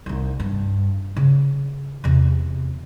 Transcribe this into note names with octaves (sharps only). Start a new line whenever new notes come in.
C2 D#4
G2
C#3
E2 C3